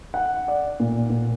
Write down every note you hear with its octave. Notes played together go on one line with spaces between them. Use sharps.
F#5
D5
A#2
A#2